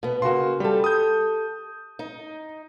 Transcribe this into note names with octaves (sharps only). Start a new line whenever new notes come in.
B2 B3
C#3 A#3 F#4 C6
G3 G4 A4
D#6 G6
D#4